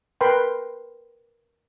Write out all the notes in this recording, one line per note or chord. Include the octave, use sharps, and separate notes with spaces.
A#4 B4 G5 B5 C6